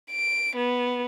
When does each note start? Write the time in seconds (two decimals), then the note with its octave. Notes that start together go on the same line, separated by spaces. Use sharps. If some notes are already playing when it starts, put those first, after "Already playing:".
0.11 D7
0.56 B3